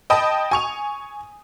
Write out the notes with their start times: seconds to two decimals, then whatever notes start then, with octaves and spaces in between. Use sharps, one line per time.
0.10 D#5 G5 A5 B5 D#6
0.51 G#5 C#6 F7